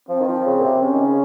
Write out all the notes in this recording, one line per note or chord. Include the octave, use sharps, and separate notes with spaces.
F3 C4
D#3
F3
C#3
A#2
C3
C3 C#4
D#3
C#3